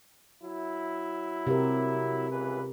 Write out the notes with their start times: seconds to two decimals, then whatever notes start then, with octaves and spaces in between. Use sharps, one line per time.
0.43 F#3 E4
1.47 C3 G4 A#4
2.29 C#2 E3 B4